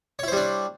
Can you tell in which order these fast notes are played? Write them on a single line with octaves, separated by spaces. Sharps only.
C#5 E4 C5 G3 D4